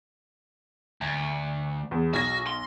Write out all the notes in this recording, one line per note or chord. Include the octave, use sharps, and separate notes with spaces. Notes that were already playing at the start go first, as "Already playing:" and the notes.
D2
E2
B1 F#4 A#6
C6